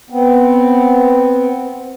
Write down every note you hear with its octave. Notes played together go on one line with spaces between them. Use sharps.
B3 C4